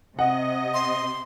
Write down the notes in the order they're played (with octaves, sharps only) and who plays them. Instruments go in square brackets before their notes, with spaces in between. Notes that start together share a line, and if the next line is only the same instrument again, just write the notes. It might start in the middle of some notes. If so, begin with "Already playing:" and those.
[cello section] C3 [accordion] D#5 [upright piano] F#5
[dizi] C6